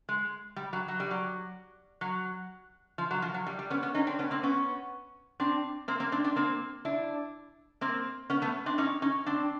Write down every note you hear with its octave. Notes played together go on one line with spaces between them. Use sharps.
G#3
G3
F#3
F#3
G3
F#3
F#3
F3
F#3
F3
F#3
G3
G3
B3 C#4
B3 C#4
C#4 D#4
C4 D4
B3 C#4
A#3 C4
B3 C#4
C4 D4
A#3 C4
A#3 C4
C4 D4
C4 D4
A#3 C4
D4 E4
A#3 C4
B3 C#4
A3 B3
C4 D4
C#4 D#4
C#4 D#4
C4 D4